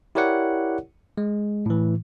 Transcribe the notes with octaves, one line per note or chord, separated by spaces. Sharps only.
E4 G4 A#4 C#5 D5 F#5
G#3
A2 E3